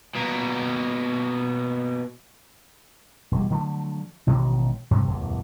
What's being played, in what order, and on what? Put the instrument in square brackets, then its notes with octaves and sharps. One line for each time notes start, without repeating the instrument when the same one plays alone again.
[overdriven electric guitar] B2 A#3
[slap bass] E1 G3
D3 F3 F#3 A3
A1 B2 D#3 G#3
G2 C3 F3 A3
E1 D2 G2